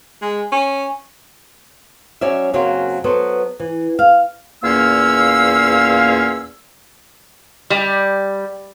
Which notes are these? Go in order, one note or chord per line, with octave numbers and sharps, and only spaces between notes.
G#3
C#4
F#3 C#4 D5 E5
F#2 C#3 F#3 A#3 C4 F#4
F#3 B3 A4 C5
E3
F5
E2 A#2 A#3 C#4 F5 E6
G3